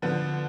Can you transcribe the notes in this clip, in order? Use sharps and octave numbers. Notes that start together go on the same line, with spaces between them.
D3 F3 B3